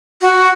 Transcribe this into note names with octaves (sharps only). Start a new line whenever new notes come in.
F#4